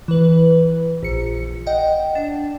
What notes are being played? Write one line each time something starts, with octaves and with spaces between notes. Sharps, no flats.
E3 B4
A#1 C#7
D#5 F#5 G5
D4